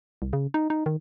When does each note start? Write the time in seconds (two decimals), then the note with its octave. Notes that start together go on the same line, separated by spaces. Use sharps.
0.22 C2
0.33 C#3
0.54 D#4
0.70 D#4
0.86 D#3